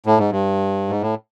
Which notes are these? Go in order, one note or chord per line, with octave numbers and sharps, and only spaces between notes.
A2
G#2
G2
G#2
A2